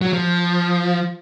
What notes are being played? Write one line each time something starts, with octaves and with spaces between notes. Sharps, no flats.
F#3
F3